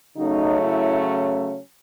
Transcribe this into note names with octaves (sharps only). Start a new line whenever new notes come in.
C#3 F#3 A3 C#4 D#4
E4